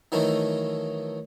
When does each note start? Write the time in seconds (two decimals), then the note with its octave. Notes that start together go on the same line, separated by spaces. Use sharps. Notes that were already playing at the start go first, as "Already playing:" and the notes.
0.12 D#3 E3 F#3 A3 D#4